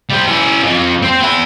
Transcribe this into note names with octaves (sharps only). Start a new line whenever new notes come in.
G3 C5
C#4 E4
F2
C4 C5
B3 E4